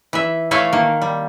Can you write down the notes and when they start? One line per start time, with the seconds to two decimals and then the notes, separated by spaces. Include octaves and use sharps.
0.13 E3 E5
0.51 E3 A3 C#5 E5 F5 A5
0.73 D#3 A#3
1.02 G3